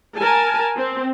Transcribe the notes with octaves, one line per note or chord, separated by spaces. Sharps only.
A#4 G#5 A5
C4